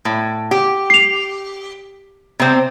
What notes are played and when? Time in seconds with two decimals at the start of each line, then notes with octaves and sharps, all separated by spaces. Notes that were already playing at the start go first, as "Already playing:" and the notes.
0.05 A2
0.51 G4
0.90 C7 F7
2.39 C3 C4